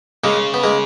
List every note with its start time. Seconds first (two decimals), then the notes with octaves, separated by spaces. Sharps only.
0.24 C#3 G#3 A#3
0.54 B3
0.63 G#3 A#3